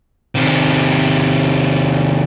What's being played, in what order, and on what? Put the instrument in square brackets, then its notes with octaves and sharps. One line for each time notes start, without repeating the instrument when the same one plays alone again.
[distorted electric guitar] C3 D#3